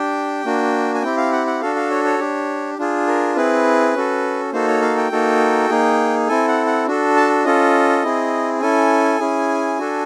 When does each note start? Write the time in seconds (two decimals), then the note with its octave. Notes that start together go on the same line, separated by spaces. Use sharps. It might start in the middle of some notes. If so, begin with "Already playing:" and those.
Already playing: D4 G4 G5
0.45 A#3 D4 F#4
0.94 G#5
1.02 C4 E4 G4 G5
1.17 F5
1.32 F#5
1.47 F#5
1.61 D4 F#4 A4 F5
1.76 F5
1.90 C#5
2.05 C#5
2.19 D4 G4
2.79 D4 F4 G#4
3.07 A#4
3.36 C4 E4 G#4 B4
3.94 C#4 F#4 A4
4.53 A#3 D#4 F#4 A4 C5
4.67 C#5
4.82 F5
4.97 G5
5.12 A#3 D#4 F#4 A4
5.70 A#3 D#4 G#4
6.28 C4 E4 A4 G#5
6.48 F#5
6.66 F#5
6.87 D4 F#4 A4
7.16 A5
7.45 C#4 F4 A4 D#5
8.04 C4 E4 G#4
8.61 C#4 E4 A4 G#5
9.20 C#4 E4 G#4
9.79 D4 F#4 A4